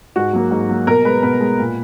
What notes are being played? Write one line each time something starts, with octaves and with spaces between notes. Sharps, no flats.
G#2 F#4
F#3 A#3
G#2
F#3 A#3
B2 A#4
G#3 B4
B2 B4
G#3
A#2